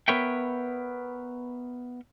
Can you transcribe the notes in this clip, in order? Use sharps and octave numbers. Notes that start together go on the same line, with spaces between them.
B3 A#4 B4 C#5 E5 G5